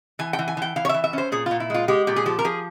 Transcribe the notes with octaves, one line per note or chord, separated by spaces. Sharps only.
E3 G#5
G5
E3
G#5
E3 G5
E3 F5
C#5
E5
E3
E5
C#4 C5
A#2 G#4
F4
A#2
E4
G#3 F4
G#3 G4
A#2 G4
G#4
F3 G4
A#4
F3 G#4